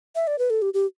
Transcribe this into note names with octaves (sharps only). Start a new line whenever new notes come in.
E5
D5
B4
A4
G4
G4